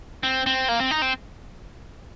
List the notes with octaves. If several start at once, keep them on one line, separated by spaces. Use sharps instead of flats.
C4
C4
A#3
C4
D#4
C4